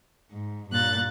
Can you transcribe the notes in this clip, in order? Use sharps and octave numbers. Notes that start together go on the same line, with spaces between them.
G#2
G2 A#2 F#6 A6